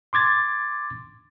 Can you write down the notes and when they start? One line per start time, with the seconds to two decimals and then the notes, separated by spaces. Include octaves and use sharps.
0.13 C6 D6 G#6 A6